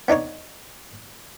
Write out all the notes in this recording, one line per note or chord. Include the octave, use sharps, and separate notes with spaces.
B3 D4 D#4 C#5